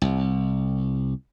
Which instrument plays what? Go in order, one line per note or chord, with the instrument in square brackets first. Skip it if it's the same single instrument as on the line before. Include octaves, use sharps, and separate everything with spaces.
[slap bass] C2